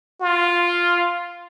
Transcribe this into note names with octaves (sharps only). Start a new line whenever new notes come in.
F4